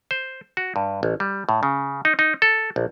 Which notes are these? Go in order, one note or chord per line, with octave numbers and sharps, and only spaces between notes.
C5
F#4
G2
A1
G3
A2
C#3
D#4
D#4
A4
A#1